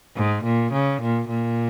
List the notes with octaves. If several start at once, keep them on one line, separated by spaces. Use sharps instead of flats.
G#2
A#2
C#3
A#2
A#2